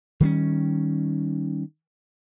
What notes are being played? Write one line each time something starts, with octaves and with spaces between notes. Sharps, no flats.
D#3 G3 B3 C#4